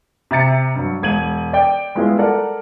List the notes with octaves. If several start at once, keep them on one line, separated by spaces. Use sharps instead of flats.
C3 E5 A#5 A6 C#7
G2 F#3
E1 G#6 D#7 F#7
D5 G5
G3 G#3 B3 E4 F4 G#4
A4 A#4 D5 F#5